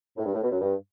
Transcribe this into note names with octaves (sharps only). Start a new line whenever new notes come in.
A2
G2
A2
B2
F#2
G2